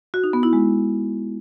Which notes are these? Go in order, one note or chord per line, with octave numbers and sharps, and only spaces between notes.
F#4
D#4
B3
E4
G#3